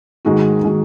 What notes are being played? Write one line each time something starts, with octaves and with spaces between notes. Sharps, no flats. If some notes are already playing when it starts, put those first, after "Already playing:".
G#2 D#3 G#3 D#4 F#4
D#3 G#3 D#4 F#4